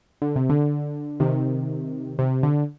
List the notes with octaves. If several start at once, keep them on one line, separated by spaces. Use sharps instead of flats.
D3
C3
D3
C3 D#3
C3
D3